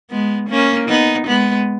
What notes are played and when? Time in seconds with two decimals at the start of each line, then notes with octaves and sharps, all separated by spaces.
0.11 G#3 B3
0.49 A#3 C#4
0.89 B3 D#4
1.27 G#3 B3